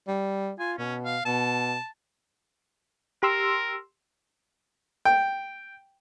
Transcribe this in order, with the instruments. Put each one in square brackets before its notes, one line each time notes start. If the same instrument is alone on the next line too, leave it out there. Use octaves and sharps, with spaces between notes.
[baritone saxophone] G3
[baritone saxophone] F4 [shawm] G#5
[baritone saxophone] B2 [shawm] C#4
[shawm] F5
[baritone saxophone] B2 [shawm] A5
[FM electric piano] G4 C6 E6 [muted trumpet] A#4
[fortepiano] G5